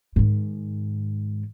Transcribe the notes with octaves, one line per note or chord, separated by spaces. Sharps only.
G#2 D#3